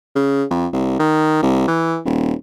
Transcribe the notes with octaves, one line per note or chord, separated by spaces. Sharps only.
C#3
F2
C2
D#3
C2
E3
D#1